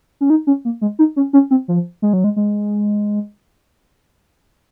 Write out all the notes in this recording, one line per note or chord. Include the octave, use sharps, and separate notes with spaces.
C#4
D#4
C#4
A#3
G#3
D#4
C#4
C#4
C4
F3
G#3
F#3
G#3
G#3